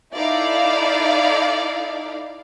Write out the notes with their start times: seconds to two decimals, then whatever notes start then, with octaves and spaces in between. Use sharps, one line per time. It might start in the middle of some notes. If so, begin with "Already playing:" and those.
0.15 D#4 E4 A4 D5 F5